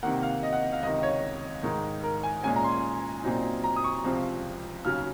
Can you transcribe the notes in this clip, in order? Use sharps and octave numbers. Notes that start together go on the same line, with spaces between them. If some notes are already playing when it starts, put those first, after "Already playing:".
C3 D#3 A#3 F#5
F5
D#5
F#5
F5
C#2 C3 D#3 D#5
C#5
G#2 D#3 G#3 D#4
A#4
G#5
A#2 G#3 C#4 G#5
A#5
C6
A#2 F#3 C4 D#4
A#5
D#6
C#6
C#2 C3 F3 C4
D#2 C#3 F#3 C#4 F6